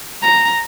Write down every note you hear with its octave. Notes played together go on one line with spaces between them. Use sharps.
A#5